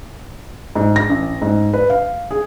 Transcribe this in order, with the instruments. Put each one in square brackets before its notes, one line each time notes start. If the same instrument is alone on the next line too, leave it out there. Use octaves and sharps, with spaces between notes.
[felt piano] G#2
A#6
A1
G#2
B4
F5
G#4